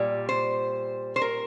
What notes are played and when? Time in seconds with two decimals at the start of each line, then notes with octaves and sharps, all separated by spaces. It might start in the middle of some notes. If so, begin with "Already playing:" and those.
Already playing: A#2 G3
0.29 C5
1.16 C5
1.22 A#4